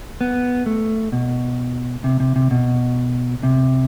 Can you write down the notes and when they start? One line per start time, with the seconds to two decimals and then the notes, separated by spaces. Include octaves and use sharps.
0.21 B3
0.66 A3
1.12 B2
2.04 C3
2.20 C3
2.36 C3
2.51 B2
3.43 C3